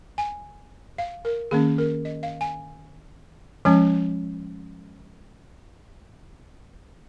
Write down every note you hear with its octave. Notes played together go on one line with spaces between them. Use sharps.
G#5
F5
A#4
D#3 A#3 C#4 G#4
A#4
D#5
F5
G#5
F3 G#3 C#4 G#5